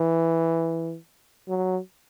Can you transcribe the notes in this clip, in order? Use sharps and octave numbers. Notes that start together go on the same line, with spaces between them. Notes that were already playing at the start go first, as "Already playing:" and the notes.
Already playing: E3
F#3